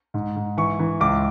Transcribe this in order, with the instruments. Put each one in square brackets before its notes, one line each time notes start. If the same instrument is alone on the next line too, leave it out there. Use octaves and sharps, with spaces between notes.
[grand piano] G#2
G#2
E3 C#6
E3
C#2 D6